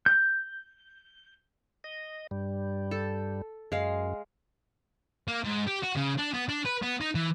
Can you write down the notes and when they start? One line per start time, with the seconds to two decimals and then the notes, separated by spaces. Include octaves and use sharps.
0.06 G6
1.84 D#5
2.31 G2 G3
2.91 A4
3.72 F#2 G#3 F5
5.28 A#3
5.44 G#2
5.67 G4
5.83 F#4
5.96 C#3
6.18 D4
6.34 B3
6.49 D4
6.66 B4
6.83 B3
7.01 D#4
7.15 E3